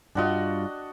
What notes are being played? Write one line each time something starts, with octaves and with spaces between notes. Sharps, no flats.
G2 D4 F4 F#4 D#5